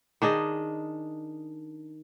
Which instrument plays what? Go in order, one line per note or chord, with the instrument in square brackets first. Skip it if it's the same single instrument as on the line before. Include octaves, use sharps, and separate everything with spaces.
[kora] D#3 D4 G#4 D#5